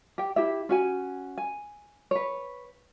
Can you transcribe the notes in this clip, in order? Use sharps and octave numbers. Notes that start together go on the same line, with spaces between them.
G4 G5
E4 G4 E5
C#4 F#4 G#5
G#5
B4 C#5